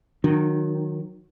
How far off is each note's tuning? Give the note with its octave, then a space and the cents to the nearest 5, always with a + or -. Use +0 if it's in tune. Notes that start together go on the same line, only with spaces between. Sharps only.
D#3 -10 F#3 -20 D4 +45